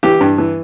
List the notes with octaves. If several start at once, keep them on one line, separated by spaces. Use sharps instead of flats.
E3 G4
G2
E3